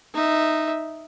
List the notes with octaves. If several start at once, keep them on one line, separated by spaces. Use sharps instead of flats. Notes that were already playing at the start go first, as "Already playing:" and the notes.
D#4 E5